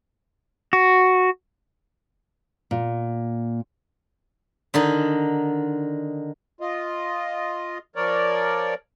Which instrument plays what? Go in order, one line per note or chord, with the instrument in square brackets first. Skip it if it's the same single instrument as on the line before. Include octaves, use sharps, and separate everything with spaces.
[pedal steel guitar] F#4
[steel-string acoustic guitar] A#2
[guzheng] D3 D#3 D#4
[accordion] F4 D#5
F3 A#4 C#5 D5